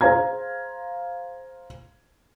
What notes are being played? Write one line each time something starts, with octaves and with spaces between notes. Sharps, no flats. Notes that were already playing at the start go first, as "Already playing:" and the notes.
G#4 C5 F5 A#5 G#6